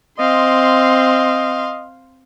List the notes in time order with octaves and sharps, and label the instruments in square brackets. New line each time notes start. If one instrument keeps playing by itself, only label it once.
[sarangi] C4 [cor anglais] D#5 [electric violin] F5 C6